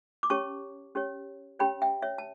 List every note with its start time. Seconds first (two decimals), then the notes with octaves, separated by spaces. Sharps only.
0.23 D6
0.30 C#4 G4 C#5 A5 C#6
0.95 C#4 G4 C#5
1.59 C#4 G4 C#5 G5 B5
1.82 E5 G5
2.02 C#5 E5
2.18 A5